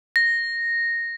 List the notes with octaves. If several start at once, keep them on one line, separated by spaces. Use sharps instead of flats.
A#6